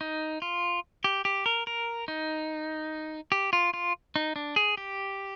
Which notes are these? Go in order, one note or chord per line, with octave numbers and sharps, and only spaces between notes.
D#4
F4
G4
G4
A#4
A#4
D#4
G4
F4
F4
D#4
D4
G#4
G4